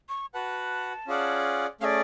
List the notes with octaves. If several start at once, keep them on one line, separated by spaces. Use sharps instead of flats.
C#6
F#4 B4 F#5 A5
C#4 F4 G#4 D5 F#5
A3 C#4 G#4 D5 F5